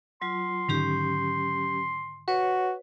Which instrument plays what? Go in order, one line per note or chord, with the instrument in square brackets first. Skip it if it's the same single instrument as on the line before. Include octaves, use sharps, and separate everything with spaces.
[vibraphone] F#3 F4 [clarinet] C6
[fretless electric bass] G#2 D3 D#3 [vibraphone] F#3 C#4 G4
[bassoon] F#4 [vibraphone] B4 C#5